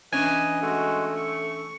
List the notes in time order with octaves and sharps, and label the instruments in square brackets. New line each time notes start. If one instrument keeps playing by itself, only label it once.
[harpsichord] E3 C#4 D4 [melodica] B4 D#5 [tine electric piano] G#5
[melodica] G#3 F#4 [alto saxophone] A3
[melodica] C#6